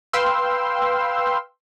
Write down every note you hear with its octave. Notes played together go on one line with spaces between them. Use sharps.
B4 F5 G5 C6 E6